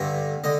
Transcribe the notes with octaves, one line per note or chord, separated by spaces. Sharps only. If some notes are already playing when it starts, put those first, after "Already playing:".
Already playing: G2 D3 E5
D3 D#5